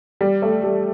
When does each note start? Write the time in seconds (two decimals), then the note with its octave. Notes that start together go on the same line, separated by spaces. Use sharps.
0.21 G3
0.42 A3
0.63 G3